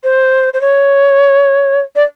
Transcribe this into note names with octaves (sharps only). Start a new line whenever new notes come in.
C5
C5
C#5
D5